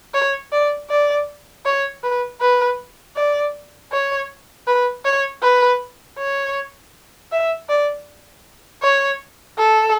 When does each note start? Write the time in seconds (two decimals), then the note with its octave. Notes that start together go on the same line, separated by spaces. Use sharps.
0.14 C#5
0.52 D5
0.90 D5
1.65 C#5
2.03 B4
2.41 B4
3.16 D5
3.92 C#5
4.67 B4
5.05 C#5
5.42 B4
6.18 C#5
7.32 E5
7.69 D5
8.82 C#5
9.58 A4